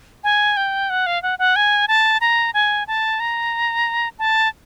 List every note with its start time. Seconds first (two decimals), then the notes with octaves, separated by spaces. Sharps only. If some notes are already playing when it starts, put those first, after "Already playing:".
0.24 G#5
0.57 G5
0.90 F#5
1.06 F5
1.23 F#5
1.39 F#5
1.56 G#5
1.88 A5
2.21 A#5
2.54 G#5
2.87 A5
3.20 A#5
4.19 A5